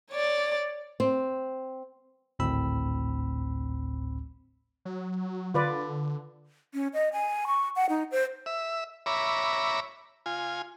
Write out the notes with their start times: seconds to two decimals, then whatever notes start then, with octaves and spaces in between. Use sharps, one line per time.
0.11 C#5 D5
1.00 C4
2.39 G#1 D2 A2 C4 B5 E6
4.85 F#3
5.54 D3 F4 B4 D5
6.74 C#4
6.94 D#5
7.13 G#5
7.47 C#6
7.76 F#5
7.89 D#4
8.11 C5
8.46 E5
9.06 C#5 E5 A#5 B5 D6
10.26 F4 G#5